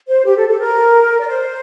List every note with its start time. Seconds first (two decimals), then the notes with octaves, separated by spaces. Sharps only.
0.09 C5
0.25 G4
0.36 A4
0.48 A4
0.59 A#4
1.20 D5
1.27 C5